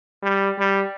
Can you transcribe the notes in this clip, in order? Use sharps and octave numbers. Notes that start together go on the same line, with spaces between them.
G3
G3